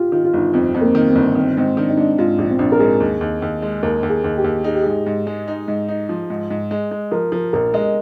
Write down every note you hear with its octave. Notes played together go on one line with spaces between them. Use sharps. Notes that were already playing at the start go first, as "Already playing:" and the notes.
Already playing: F4 G4
D#3 F4
F4
G1 D#4
F2 C4
F2 C4
A#3
D#3
C4
G1
D#3 C4
G#2 C4
D#3 D4
D#4
G#2 D4
G#2 F4
A#1 F4
C4
A#1 D4
A#4
G#2 G#4
D#2
D#2
D#2
G#3
D#2 A#4
D#2
G#4
D#2
G4
D#2
D#4 G#4
G4
G#2 G#4
G#2
G#3
D#4
G#2
D#4
F3
G#2
G#2
G#3
G#3
F3 A#4
F3 A#4
A#1 A#4
G#3 D#5